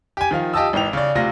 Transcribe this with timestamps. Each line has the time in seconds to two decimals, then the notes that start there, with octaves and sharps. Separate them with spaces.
0.17 G4 G#5
0.31 D#3 F3 F5
0.54 F4 G4 D#5 A5 D#6 E6
0.73 G#1 E3 D#4 G5 F7
0.93 C#3 D5
1.15 D2 C3 F4 A#6